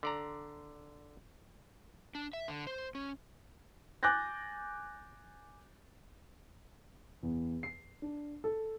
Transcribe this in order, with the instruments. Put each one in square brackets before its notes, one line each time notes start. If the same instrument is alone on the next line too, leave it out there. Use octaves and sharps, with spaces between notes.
[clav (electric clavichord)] D3 D5 A#5
[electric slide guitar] D4
E5
D3
C5
C#4
[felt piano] G#5 D6 F#6 G6 A6 A#6
[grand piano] E2
C7
D4
A4